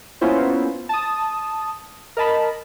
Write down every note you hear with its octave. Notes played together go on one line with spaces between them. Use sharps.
A#3 B3 C#4 E4 F4 C5
A5 D#6
A#4 D#5 A5 B5